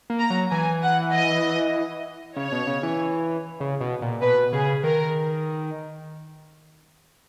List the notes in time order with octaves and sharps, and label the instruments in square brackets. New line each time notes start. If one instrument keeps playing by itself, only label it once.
[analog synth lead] A#3
[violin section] A#5
[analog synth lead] F#3
[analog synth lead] E3 [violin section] G#5
[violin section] F#5
D#5
[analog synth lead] C#3 [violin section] C#5
[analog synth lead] B2
C#3
E3
C#3
B2
A#2
[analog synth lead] B2 [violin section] B4
[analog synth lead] C#3 [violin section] G#4
[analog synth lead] D#3 [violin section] A#4